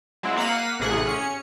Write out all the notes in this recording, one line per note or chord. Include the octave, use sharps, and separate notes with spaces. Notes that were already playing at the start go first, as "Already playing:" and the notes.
F#3 G#3 C4 E4
A#3 F5 F#5 B6 D#7
A1 A2 C3 G#4 F#5 F#6
C#4 C#7